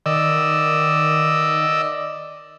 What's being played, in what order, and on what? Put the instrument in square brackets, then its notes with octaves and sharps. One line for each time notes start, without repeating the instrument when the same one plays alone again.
[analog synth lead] D#3 [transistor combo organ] D5 D#5 E6